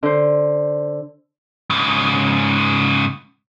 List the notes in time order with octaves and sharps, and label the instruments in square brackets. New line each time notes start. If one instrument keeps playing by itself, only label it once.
[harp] D3 C5
[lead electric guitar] G#2 C#3